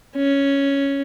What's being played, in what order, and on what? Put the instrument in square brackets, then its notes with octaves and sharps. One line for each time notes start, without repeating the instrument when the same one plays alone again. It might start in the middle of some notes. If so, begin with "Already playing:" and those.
[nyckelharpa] C#4